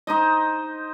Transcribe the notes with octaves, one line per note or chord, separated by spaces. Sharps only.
D#4 C5 D#5